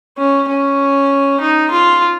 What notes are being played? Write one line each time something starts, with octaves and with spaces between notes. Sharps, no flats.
C#4
C#4
D#4
F4